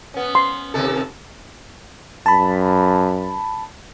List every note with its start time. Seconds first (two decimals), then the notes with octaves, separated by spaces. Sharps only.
0.14 B3 C#4
0.35 C6
0.74 D#2 C3 A4
2.26 F#2 A5 B5